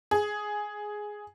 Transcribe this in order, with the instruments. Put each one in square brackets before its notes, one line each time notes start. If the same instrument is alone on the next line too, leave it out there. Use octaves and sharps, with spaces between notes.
[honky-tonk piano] G#4